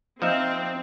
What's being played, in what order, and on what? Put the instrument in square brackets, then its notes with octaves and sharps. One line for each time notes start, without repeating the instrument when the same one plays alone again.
[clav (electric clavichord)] F3 D#4 E5 [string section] C4